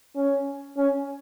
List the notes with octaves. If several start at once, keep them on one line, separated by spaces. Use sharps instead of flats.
C#4
C#4